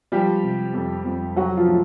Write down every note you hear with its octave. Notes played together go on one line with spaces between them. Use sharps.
F3 G3 G4
C3
F2
F2
F#3 F#4
F3 F4
A2